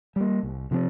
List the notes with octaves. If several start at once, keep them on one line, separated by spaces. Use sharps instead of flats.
G3 A#3
C2
C3 F3 C4